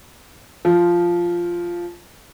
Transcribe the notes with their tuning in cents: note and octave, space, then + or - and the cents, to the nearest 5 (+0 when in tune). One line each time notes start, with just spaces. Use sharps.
F3 -5